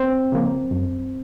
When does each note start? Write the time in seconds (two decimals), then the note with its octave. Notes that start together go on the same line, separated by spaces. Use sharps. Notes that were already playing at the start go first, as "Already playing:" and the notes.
Already playing: C4 C5
0.32 C#3 F3 A#3
0.71 F#2